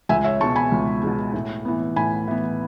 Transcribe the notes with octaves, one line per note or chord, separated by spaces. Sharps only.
C#2 E5 G#5
C#5 E5
B2 G#3 A5 C#6
G#5 B5
C#2
B2 G#3
A2
E3 B3
A2 G#5 B5
E3 B3